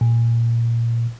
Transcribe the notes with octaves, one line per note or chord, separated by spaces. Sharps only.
A#2